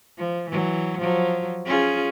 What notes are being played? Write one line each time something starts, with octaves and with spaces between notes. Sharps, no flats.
F3
E3 F#3
F3 F#3
C#4 F4 G#4